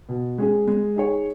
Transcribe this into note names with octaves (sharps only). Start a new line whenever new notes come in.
B2
G#3 C#4 G#4
G#3
D#4 G#4 C#5